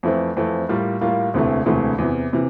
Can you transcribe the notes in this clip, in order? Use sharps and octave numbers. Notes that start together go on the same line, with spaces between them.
F2 E3 A3 C4
F2 E3 A3 C4
A2 G3 A#3 F4
A2 G3 A#3 F4
E1 D2 C3 E3 A3
E1 D2 C3 E3 A3
E2 C3 E3
C3 E3